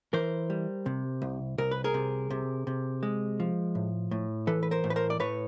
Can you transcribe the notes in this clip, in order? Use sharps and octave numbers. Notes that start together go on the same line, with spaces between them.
E3 A#4 C5
G3
C3
C2
C2 A#4
B4
G#4 A#4
C3
C3
C3
G#3
F3
A2
A2
E3 A4 B4
B4
A#4 C5
A2
B4
A#4 C5
D5
A2 B4 C#5